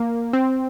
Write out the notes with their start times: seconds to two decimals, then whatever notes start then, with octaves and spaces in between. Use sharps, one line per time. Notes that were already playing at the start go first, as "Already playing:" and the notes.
Already playing: A#3
0.33 C4